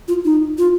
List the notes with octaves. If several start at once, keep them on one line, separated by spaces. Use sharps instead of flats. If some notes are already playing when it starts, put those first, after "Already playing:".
F4
D#4
F4